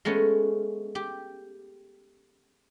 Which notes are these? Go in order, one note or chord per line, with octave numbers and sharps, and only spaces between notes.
G#3 A3 B3 C#4
G4